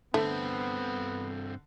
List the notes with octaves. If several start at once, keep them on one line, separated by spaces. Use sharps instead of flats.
G2 D3 A3 B3 C4